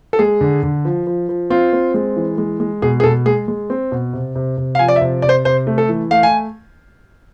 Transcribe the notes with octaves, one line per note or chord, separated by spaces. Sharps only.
A4
G#3 G#4
D3
D3
F3
F3
F3
C4 F4
C4
G#3
E3
G#3
G#3
B2 G#4
G#4
B2 A4
G#3 G#4
G#3
C4
B2
C3
C3
C3
F5
F3 G#5
D5
E5
C3
C3 D5
C5
C3 C5
A3
A4
E3
A3 F5
G#5